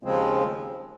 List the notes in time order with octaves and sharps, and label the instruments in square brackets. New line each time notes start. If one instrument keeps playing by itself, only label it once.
[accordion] D#2 C#3 F3 G#3 C4